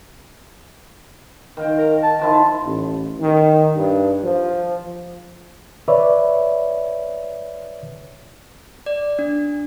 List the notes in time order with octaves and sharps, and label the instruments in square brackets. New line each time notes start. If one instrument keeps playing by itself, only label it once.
[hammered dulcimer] D#3 F5 G5
[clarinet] A#4
A5
[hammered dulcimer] D#3 F3 E4
[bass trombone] A1
D#3
G2
F3
[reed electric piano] B4 C#5 D5 E5
[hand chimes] D5
D4